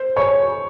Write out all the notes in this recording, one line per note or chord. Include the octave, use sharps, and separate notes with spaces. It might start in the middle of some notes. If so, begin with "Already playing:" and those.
Already playing: C5
C#5 C#6